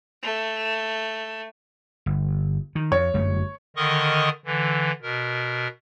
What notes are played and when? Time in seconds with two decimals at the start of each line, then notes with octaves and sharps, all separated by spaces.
0.23 A3
2.06 G1
2.75 D#3
2.92 F2 C#5
3.14 G1 F#2 A3
3.76 D3 D#3 A#4 D#5 C#6 D#6
4.45 D3 E3
5.02 B2 A#4